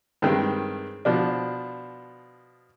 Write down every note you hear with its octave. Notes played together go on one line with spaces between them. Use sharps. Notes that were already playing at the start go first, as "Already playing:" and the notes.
G2 D#3 G3 G#3 C4
B2 F3 D4